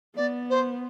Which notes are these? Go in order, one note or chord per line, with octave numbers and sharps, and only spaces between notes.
B3 D5
C5